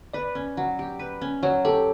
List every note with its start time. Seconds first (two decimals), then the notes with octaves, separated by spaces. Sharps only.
0.14 B4 D5
0.35 C#4
0.57 F#3
0.79 G4
0.99 B4
1.21 C#4
1.43 F#3 C#5
1.65 G4 A4